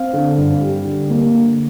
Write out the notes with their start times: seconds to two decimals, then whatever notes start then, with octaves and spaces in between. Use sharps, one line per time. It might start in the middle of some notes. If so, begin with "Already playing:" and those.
Already playing: C4 F5
0.13 D3
0.38 G2
0.61 G3
0.85 D3
1.10 A#3
1.35 D3